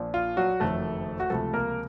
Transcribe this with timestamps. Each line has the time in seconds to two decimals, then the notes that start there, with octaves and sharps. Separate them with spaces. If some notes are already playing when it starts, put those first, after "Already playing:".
Already playing: A#1 A#2 F3
0.14 F4
0.37 F#3 F#4
0.60 F#1 F2 D#3 F#3 A3 A4
1.20 F#4
1.30 C#2 C3 F3 A3 A4
1.54 A#3 A#4